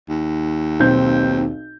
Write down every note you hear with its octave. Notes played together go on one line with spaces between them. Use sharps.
D#2
B1 C4 G6